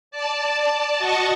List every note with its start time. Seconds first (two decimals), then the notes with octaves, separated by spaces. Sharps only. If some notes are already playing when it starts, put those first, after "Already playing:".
0.11 D5 A5
0.98 F#4 D#5 A5 C#6